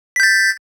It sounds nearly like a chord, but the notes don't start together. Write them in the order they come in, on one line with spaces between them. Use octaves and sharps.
B6 G6 A6